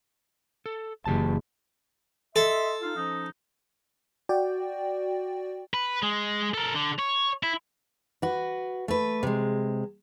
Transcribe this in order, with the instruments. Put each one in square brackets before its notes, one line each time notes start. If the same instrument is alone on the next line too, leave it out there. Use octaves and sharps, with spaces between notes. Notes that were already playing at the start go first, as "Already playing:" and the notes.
[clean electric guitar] A4
[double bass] F#1 [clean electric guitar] E3 G4 A5
[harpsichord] A4 [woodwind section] D#5 E5 C6
[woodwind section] D#4 F4 F5
F3 C#4 D#4
[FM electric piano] F#4 D5 G5
[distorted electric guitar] B4
G#3
A4 A#4
D3
C#5
E4
[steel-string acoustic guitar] F#4 B4
A3 B4
C3 G#3